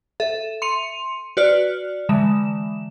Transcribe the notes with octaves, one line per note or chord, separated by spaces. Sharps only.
A4 E5
C6 C#7 D#7 F7
F#4 B4 D5 F6
D3 E3 G#3 E7